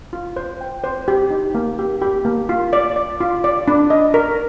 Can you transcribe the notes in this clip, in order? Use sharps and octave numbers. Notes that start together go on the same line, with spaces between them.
F4
C5
G5
C5
G4
D#4
A#3
G4
G4
A#3
F4
D5
D5
F4
D5
D4
D#5
A#4